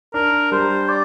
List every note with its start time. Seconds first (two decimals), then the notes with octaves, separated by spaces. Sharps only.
0.14 D4 A#4
0.52 G3 C5
0.89 D5